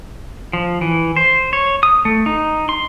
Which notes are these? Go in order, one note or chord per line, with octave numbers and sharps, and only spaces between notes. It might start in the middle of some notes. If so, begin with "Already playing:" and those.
F3
E3
C5
C#5
D#6
A3
D#4
C6